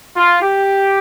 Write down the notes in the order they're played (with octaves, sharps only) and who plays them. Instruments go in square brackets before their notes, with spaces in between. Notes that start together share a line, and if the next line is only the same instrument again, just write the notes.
[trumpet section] F4
G4